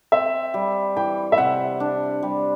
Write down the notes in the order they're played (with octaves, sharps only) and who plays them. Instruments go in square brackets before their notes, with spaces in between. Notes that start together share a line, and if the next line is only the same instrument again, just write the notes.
[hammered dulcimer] C4 [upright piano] E5
[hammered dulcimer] G3
[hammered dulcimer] E3 [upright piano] G5
[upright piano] E5
[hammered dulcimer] C3 [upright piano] F#5
[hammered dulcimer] D4
G3